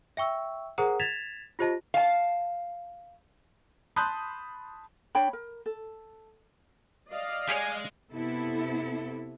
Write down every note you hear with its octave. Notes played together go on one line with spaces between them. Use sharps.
E5 G5 C#6 E6
G#4 A#4 C5 F#5 A#5 D#6
G#6 A6 B6 E7 F7
F4 G4 C5 D#5 A5 A#6
F5 A5
A5 B5 C6 D#6 F#6 G6
D4 C#5 G5 B5
A#4
A4
D5 D#5 F5
G#3 G4 G#4 C#5 G#5
C3 B3 E4 A4